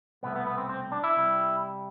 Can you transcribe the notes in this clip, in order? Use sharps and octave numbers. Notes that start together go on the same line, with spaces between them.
C2 B2 A3 B3
B3
B3
C4
C4
D4
E4
C3 G3